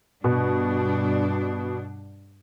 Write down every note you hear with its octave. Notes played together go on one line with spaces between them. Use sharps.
G2 B2 D4